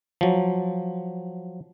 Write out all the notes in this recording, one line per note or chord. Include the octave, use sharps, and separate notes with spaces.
F3 F#3